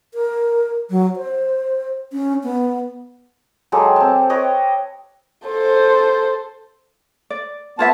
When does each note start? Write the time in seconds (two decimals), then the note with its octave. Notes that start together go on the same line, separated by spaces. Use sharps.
0.14 A#4
0.90 F#3
1.16 C5
2.13 C#4
2.44 B3
3.72 F#3 G#3 G4 A4
3.96 C4 A5
4.30 B4 C#5 D#5 G5
5.46 A4 C5
7.30 D5
7.79 B3 F4 C#5 E5 A5